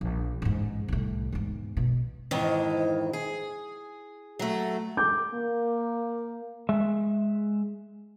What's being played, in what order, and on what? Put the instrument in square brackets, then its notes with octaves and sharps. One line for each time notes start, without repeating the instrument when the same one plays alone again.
[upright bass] A#1
A1 G#2
C2 A2
E2 G#2
B2
[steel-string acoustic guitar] F2 G#2 D#3 E3
G#4
F#3 A3
[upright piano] D6 G6
[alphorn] A#3
[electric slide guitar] G#3 E5